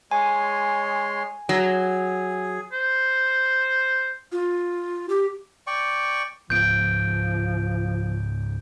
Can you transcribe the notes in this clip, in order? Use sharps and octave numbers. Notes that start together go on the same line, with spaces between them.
G#3 C#5 G#5 C6
F#3 G#4
C5
F4
G4
D5 G5 C#6
C#2 G#2 F3 B3 G6 D7